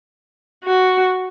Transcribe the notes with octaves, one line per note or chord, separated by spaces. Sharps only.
F#4